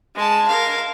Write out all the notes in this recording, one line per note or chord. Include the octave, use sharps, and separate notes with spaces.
G#3 A5
A#4 F5